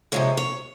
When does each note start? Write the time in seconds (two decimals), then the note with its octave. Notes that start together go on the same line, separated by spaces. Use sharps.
0.12 C3 F3 G#3 C#5
0.37 C#5